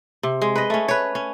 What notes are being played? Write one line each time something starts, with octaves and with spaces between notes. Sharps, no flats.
C3
G#3
B4 D#5
A3 C#4
B4 C#5
C#4